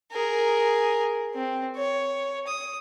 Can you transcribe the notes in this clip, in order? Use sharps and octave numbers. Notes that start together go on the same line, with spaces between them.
G#4 A#4
C4
C#5
D#6